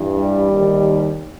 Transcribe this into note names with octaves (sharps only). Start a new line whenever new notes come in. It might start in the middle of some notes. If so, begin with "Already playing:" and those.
Already playing: G2 E3
G3
D#2 D#3